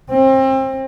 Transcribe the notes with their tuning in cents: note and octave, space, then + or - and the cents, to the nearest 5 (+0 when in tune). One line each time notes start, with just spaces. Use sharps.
C4 +30